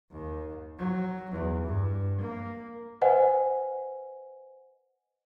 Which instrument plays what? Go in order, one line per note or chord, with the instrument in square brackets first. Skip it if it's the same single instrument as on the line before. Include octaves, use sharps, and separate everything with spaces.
[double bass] D#2
F#3
E2
G2
A#3
[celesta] B4 C5 D#5 F#5 G#5